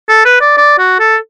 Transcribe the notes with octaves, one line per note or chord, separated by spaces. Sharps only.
A4
B4
D5
D5
F#4
A4